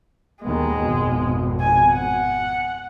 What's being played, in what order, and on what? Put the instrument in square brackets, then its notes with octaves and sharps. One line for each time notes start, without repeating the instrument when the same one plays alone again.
[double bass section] D#2 D#3 B3 [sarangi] G#3
[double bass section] G#1 F2 B2
[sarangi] G#5
F#5